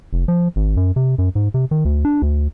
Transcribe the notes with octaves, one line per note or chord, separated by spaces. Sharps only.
F1
F3
G#1
F#2
C3
F#2
G#2
C3
D#3
D2
D4
D2